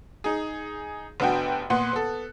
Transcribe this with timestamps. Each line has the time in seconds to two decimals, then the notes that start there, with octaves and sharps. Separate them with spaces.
0.24 D#4 G#4
1.20 F1 B3 D4 F#4 G5
1.70 A#2 B3 B4 F#5 C6 F#6
1.93 B3 A4